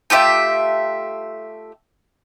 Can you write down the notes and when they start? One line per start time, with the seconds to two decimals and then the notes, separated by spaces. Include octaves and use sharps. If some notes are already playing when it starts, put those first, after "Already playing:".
0.10 A3 F4 G4 E5